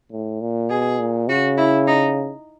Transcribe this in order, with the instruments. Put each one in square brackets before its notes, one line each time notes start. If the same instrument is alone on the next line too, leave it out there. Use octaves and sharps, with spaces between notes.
[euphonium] A2
A#2
[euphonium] B2 [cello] G#4
[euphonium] A#2
[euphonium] C#3 [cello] F#4
[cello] E4
D#4